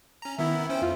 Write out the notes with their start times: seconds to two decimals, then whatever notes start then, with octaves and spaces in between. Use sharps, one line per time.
0.22 C#4 A#5
0.38 D#3 B3 E4 E5
0.69 C#4 C5 G5
0.82 F2 F4